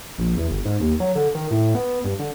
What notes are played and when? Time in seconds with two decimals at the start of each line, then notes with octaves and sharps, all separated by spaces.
0.18 A#1
0.37 E2
0.50 G1
0.65 G#2
0.80 D#2
1.00 F#3
1.15 D3
1.35 D#3
1.51 A2
1.75 B3
2.04 G2
2.20 D3